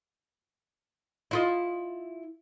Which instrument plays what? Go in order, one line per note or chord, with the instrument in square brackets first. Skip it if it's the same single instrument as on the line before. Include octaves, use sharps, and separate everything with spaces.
[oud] E4 F4 D#5